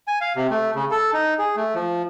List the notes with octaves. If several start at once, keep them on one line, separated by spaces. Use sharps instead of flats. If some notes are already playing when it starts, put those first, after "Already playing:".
G#5
F5
C3
A3
C#3
A4
D#4
G#4
A3
F3